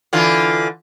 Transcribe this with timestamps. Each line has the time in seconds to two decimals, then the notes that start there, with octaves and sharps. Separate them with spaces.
0.13 D3 E3 F4